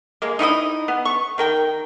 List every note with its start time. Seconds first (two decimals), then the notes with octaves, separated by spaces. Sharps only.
0.22 G#3 A#3
0.39 D#4 E4 G4 D#5
0.88 B3
1.05 C#6
1.38 D#3 A#4 G5